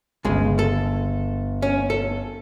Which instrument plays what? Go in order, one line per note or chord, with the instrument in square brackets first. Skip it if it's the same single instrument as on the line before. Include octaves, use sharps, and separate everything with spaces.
[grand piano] G1 [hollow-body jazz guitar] C#3 G#3
[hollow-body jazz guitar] A4
C#4
A4